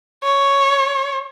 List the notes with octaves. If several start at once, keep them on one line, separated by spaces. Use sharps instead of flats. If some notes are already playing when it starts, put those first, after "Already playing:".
C#5